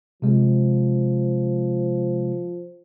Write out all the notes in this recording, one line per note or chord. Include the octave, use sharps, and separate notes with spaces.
C3 F3 G#3